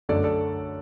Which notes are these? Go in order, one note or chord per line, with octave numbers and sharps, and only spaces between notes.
F#2 D3 A3 A4 D5
A4 D5